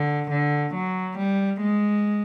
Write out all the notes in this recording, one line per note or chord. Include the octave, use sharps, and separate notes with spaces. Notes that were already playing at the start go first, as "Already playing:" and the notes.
Already playing: D3
D3
F#3
G3
G#3